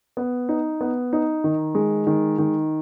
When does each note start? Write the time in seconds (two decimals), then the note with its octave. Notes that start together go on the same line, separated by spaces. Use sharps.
0.17 B3
0.49 D#4
0.81 B3
1.13 D#4
1.44 D#3
1.75 G#3
2.07 D#3
2.39 D#3